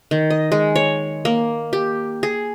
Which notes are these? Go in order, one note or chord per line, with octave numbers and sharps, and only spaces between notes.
D#3
D#5
G#3
C#5
A#3
G4
G#4